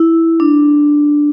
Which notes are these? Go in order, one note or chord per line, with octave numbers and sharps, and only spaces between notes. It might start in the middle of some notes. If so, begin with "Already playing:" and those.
Already playing: E4
D4